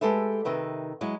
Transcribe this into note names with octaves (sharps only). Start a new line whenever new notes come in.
G#3 G4 A4 B4 E5
C3 D#3 B4 E5
F#3 G#3 E4